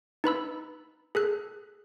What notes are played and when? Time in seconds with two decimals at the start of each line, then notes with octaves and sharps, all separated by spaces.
0.24 D#4 B4 B5 E6
1.15 G#4 A4 F#6